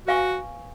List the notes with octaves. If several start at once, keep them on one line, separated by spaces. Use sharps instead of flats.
F#4 B4 F5 G#5 C#6